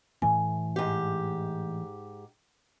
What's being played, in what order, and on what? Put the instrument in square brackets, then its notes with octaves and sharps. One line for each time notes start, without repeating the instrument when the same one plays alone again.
[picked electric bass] A2 E3 A3 [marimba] G#5
[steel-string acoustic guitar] G#2 G4